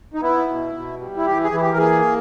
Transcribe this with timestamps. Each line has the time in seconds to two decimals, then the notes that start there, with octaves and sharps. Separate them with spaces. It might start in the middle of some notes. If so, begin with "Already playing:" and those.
0.14 D#4
0.21 B3 E4
0.47 B2
0.74 B2
0.99 G3
1.17 E4
1.26 E3 G4
1.44 G#4
1.52 E3 E4
1.61 G4
1.71 A#4
1.78 A#3 G#4